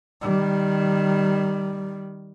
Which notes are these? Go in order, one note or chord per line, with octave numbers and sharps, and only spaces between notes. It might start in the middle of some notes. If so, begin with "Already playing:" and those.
D#3 G3